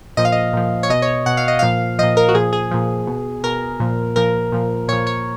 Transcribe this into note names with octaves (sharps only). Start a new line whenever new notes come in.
A#2 F3 D#5
F5
D#5
A#2 F3
C#5
B2 D#5
C#5
B2 F#5
F5
D#5
A#2 F3 F5
A#2 F3 D#5
A#4
F#4
A#2 F3 G#4
G#4
A#2 F3
B2
B2 A#4
A#2 F3
A#2 F3 A#4
A#2 F3
A#2 F3 C#5
C#5